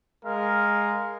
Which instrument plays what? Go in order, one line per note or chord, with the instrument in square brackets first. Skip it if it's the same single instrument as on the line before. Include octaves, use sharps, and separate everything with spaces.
[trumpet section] G#3 A#4 F5